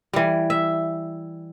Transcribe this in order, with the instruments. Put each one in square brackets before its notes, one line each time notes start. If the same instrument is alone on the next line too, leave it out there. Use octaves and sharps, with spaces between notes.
[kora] E3 G3
E5